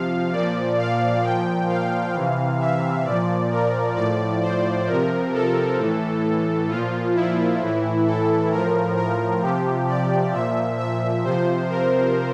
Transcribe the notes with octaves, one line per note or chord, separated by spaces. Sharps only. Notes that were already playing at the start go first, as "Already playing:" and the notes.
Already playing: C3 F3 F5
A#2 F3 D5
F5
A#2 F3 G5
F5
C3 E3
E5
A#2 F3 D5
A#4
A2 F3 D5
C5
C3 F3 A#4
A4
A2 E3
A#2 F3 F4
E4
A2 E3
A4
A2 F3 A#4
A#4
C3 F3 G4
D5
A#2 F3 E5
E5
C3 F3 C5
A#4